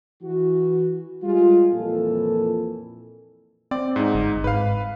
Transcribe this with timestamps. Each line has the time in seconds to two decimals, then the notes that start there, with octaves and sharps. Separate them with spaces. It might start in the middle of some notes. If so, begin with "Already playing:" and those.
0.22 E3 F#4
1.23 G3 G#3 F4
1.73 F2 A#2 E3 A4
3.71 C4 D5
3.96 G#2 D#4
4.14 G1
4.44 G#2 B4 F5